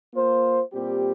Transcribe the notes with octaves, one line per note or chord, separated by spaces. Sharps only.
A#3 F4 C5
A#2 G3 C4 G4